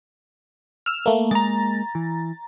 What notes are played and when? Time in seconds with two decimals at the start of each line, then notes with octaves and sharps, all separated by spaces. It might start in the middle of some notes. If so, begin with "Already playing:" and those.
0.86 E6 F6
1.06 A3 A#3
1.31 G#3 A#3 A#5 A6
1.95 E3